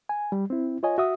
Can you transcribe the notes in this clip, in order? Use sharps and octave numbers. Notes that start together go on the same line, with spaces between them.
G#5
G3
C4 E4
F4 C#5 D#5 G#5
F#4 E5 D#6